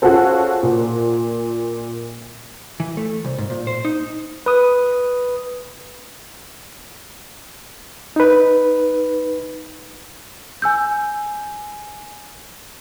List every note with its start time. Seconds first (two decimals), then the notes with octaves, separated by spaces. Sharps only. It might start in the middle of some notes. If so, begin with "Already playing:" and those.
0.02 C#4 F4 F#4 G#4 A4 C5
0.63 A#2
2.80 E3
2.97 A3
3.24 C2
3.38 G#2
3.50 A#2
3.67 C5
3.85 D#4
4.46 B4 D#6
8.16 D#4 B4
10.62 G#5 E6 G6